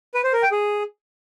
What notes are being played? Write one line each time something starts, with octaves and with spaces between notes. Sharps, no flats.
B4
C5
A#4
G5
G#4